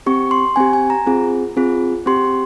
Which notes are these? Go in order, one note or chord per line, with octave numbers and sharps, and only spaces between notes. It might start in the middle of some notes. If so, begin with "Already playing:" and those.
C4 G4 C#6
C6
C4 G4 G#5
G#5
A#5
C4 F4 G#4
C4 F4 G#4
C4 G4 C6